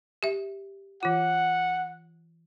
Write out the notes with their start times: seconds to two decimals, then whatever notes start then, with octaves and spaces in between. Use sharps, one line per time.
0.23 G4 E5
1.03 E3 F4 F#5